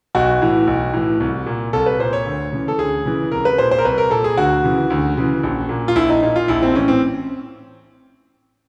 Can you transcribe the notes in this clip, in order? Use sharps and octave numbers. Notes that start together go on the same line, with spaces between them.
B1 F#4
A2 E3
B1
A2 E3
C2
A#2
C2 A4
B4
A#2 C5
C#5
D2
C#3 E3
A4
D2 G#4
C#3 E3
C2 A#4
B4
A#2 C5
C5
A#4
C2 B4
A#4
A#2 A4
G#4
D2 F#4
C#3 E3
D2
C#3 E3
A#1
A#2
F4
A#1 E4
D#4
A#2 D#4
F4
A#1 E4
C4
A2 E3 C#4
C4